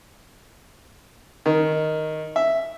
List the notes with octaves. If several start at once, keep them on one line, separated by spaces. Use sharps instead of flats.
D#3
E5